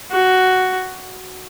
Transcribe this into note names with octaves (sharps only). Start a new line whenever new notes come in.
F#4